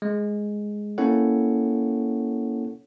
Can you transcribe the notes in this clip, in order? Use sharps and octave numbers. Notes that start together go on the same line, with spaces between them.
G#3
A#3 C#4 E4 A4 C#5 F#5